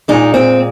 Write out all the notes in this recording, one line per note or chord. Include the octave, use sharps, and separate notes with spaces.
A#2 G#3 D#4
C4